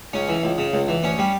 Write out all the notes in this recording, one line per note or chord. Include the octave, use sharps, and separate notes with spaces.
C#2 C#4
E3
C#2
C#3
C#2
E3
D2 C#4
G3